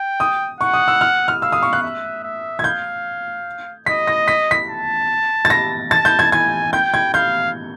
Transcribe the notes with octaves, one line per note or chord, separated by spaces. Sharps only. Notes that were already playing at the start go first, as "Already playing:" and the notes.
Already playing: G5
D#6
F#5 C#6
D#6
E6
F6
F6
F5 E6
D#6
C#6
F#6
E5
E5
G#6
F5 G6
D#5 B6
A#6
B6
B6
A5
A6
A#6
A5 A6
G6
G#6
G#5 G#6
G5 G6
G#6
F5 G6